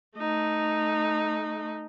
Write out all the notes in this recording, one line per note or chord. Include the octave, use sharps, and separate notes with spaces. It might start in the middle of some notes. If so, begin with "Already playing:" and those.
A3 D#4